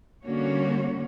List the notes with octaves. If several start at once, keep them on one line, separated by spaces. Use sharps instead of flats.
D3 G3 A#3 C#4 F#4 C#5